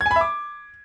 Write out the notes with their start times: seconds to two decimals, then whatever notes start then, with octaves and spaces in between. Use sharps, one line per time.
0.01 G#6
0.06 G#5
0.11 B5
0.16 E5
0.21 D6